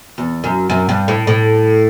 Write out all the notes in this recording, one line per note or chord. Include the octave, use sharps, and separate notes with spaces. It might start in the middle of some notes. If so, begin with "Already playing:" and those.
E2
F#2
F#2
G2
A2
A2